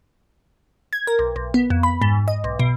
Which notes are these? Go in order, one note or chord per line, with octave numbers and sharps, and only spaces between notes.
G#6
A#4
B1
B1
B3
F2
B5
G#2
D#5
B1
B2